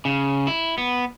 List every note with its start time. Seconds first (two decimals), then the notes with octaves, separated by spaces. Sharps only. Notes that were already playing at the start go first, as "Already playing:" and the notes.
0.05 C#3
0.47 E4
0.78 B3